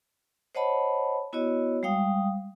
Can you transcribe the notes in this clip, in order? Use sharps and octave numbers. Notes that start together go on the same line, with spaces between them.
C5 C#5 D#5 F#5 A5 B5
B3 E4 F#4 C#5 D#5
G3 G#3 F5 G5 D#6